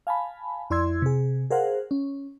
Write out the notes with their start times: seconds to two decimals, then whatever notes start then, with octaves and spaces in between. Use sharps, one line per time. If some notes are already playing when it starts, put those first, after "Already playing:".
0.07 F5 G#5 A5 B5
0.70 F2 E4 D5 C6 E6 G#6
1.02 C3 G#4
1.50 G#4 A#4 C5 F5 F#5
1.91 C#4